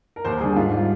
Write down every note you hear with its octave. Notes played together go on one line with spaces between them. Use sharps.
A#4
D#2 C5
D3 G3 G#4
G#2 F4
G3 F4